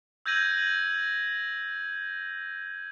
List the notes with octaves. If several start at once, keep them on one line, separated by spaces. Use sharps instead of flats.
E6 G6 G#6 A#6 D#7 F#7